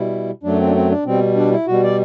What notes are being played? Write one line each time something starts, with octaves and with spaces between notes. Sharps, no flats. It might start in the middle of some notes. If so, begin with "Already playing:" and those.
Already playing: B2 G3 E4
F#2 F#3 A3 D4
C4
D4
C4
D4
B2 G3 C4
D4
E4
B2 G3 F#4
D5